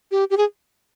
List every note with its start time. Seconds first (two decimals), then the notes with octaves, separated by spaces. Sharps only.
0.11 G4
0.30 G4
0.37 G#4